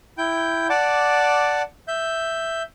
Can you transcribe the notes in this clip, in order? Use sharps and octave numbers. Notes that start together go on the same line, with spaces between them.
E4 G5 G6
D5 F#5 A5 D6
E5 G6